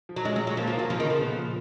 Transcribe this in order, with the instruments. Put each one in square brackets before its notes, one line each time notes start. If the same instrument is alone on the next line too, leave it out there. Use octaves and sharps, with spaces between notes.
[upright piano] F3
[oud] F#3
[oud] G#3 [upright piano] C#4
[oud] F#3
[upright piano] G#3
[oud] F#3
[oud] F3 [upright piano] A#3
[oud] F3
[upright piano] F4
[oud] F#3
[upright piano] C#3 [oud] F3
[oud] D#3
[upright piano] C#3 [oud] F3
[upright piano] B3
A#2